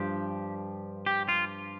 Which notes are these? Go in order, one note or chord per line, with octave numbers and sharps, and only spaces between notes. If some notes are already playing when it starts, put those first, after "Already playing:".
Already playing: G2 F3 G4
G4
F4